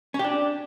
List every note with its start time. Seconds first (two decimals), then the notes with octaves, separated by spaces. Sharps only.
0.14 C#4
0.19 G4
0.24 D4